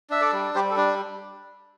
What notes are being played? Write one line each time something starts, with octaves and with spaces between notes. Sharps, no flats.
D4 E5
A4 D5
G3
G3 G4 C5
A4
D4